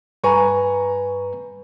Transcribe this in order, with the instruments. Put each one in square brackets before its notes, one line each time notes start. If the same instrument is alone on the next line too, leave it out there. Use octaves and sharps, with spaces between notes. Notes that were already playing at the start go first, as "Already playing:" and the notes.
[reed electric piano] G2 B4 [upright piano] G#5 A#5 C#6